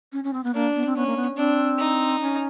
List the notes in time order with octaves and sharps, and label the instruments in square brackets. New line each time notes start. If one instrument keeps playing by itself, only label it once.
[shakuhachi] C#4
C#4
C4
B3
[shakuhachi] A#3 [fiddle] D4
[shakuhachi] B3
C4
[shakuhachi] B3 [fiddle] C#4
[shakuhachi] A#3
B3
[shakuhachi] C4 [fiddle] D4
[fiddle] D#4
[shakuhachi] C#4